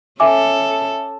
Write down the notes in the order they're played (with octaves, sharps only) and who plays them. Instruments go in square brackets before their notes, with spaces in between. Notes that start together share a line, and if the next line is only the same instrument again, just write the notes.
[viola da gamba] C#4 A4 [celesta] E5 G#5 D6